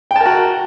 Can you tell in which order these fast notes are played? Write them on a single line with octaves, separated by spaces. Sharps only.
G5 A5 A#4 F#4